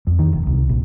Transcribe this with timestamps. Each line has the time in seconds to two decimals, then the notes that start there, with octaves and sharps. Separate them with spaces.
0.07 F2
0.19 D#3
0.33 E1
0.47 C2
0.69 A#1